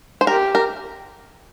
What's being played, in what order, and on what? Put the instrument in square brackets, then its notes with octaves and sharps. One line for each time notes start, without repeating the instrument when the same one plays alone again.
[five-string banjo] C5
[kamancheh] G4 [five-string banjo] A#4
[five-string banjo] A#4